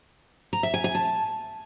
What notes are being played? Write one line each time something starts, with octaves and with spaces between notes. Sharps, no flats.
A#5
E5
G#5
G#5
A5